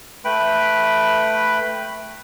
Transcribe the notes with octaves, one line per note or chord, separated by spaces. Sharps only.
A3 B4 G5 B5